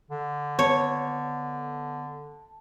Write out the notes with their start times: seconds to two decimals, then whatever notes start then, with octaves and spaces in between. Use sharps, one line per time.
0.11 D3
0.59 B3 C#5 A5